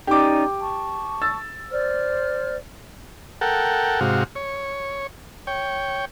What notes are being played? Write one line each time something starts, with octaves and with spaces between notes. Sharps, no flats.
C#4 D#4 G4 D5 D6
A5 C#6
E6 A6
C5 D5 F6
A4 A#4 F#5 G5
G#2 C3 F#4 F5
C#5
C#5 G5